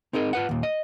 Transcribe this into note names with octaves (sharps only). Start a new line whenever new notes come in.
C4 D#4 G#4 A#4 D#5
F4 B4 F#5
D#2 A#2
D#5